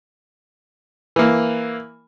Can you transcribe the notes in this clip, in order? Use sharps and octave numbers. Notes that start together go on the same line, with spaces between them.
E3 A#3